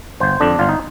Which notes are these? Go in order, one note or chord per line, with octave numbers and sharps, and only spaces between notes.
G1 C5
F2 D3 D4
G1 F4
D#4